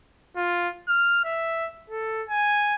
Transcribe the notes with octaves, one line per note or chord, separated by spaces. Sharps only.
F4
F6
E5
A4
G#5